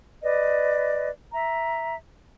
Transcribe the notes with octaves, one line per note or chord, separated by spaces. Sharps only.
B4 D5 D#5
E5 A#5